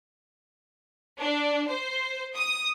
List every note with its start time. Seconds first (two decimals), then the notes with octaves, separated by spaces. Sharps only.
1.18 D4
1.67 C5
2.34 D#6